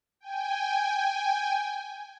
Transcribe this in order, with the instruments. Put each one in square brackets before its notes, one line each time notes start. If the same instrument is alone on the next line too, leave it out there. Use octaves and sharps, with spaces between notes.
[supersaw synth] G5 G#5